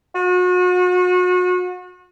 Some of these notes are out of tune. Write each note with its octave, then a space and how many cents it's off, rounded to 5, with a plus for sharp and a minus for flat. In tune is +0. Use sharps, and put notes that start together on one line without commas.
F#4 -35